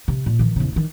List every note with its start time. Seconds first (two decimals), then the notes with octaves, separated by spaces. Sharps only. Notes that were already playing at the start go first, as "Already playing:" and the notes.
0.08 C3
0.26 A#2
0.39 D#3 E3
0.56 E2 C#3
0.72 D#3 E3